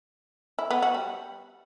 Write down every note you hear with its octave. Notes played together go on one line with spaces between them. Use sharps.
E4
B3
F#4
G3